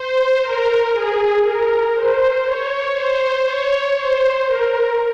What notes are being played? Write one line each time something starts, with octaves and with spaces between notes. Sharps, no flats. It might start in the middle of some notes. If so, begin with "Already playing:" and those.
Already playing: C5
A#4
G#4
A#4
C5
C#5
C5
C#5
C5
A#4